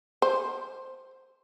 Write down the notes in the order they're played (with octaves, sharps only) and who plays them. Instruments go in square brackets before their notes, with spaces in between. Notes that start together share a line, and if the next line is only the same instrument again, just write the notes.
[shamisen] C5